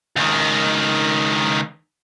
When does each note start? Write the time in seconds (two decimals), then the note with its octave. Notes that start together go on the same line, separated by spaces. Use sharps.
0.16 C#2 D#3